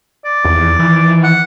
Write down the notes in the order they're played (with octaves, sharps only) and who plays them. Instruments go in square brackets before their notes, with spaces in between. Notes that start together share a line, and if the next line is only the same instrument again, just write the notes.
[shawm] D5
[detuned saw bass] E2
E3
[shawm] F#5